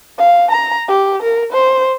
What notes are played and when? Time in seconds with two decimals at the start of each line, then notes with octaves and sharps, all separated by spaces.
0.18 F5
0.51 A#5
0.89 G4
1.22 A#4
1.52 C5